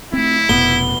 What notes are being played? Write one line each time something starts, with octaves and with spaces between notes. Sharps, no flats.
A3 C4 E4
F1 B2 B3 G7